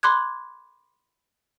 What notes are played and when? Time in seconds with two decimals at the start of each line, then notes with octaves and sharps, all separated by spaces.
0.03 B5 C6 D6 F#6 G#6